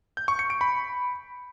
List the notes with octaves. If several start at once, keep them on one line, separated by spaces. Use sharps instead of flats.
G6
C#6
C#7
D7
B5